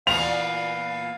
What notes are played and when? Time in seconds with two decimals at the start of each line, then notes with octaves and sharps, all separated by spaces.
0.07 A#2 E3 B3 F5 F7